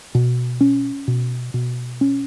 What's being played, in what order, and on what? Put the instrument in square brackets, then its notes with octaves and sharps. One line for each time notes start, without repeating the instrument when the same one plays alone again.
[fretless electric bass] B2
C#4
B2
B2
C#4